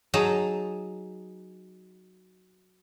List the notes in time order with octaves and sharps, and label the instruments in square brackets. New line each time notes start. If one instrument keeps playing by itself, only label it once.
[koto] F#3 D#4 G#4 A5